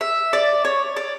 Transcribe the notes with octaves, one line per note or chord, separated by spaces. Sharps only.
E5
D5
C#5
D5